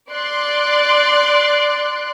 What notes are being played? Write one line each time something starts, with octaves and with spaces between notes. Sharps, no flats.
D5 C6 F#6